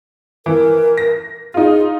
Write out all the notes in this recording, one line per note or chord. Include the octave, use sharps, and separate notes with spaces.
E3 A#4
A#6
D#4 F4 G#4